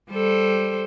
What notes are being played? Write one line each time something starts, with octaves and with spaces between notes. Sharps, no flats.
G3 A4 C5